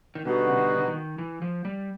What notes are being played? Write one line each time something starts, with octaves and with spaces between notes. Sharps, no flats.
D#3
B2 D3 G3 B3 D#4 F#4
C#3
D3
D3
D#3
E3
F3
G3